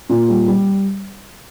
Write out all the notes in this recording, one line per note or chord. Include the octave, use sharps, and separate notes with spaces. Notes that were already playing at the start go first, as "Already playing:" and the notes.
A#2
G3
G3